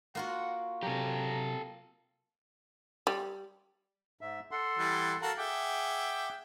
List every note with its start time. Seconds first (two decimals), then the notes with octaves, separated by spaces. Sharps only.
0.15 A#3 F4 F#4 F#5
0.83 C3 F#3 G4 A4 A#5
3.07 G3
4.21 G#2 E5
4.51 A4 F#5 C6
4.77 E3 G3
5.22 F#4 A4 A#4 F5
5.38 G#4 E5 F#5 G5 D6